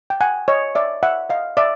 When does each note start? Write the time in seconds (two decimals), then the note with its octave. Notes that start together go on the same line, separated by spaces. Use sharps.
0.10 G5
0.21 F#5 G#5
0.48 C#5 D#5
0.75 D5 E5
1.03 E5 F#5
1.30 D#5 F5
1.57 D5 E5